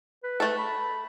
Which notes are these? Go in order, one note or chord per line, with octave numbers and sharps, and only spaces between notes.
B4
A3 A4
B5